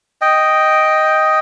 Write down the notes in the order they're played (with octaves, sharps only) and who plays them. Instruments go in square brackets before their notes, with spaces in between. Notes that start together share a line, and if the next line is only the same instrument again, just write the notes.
[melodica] D#5 G5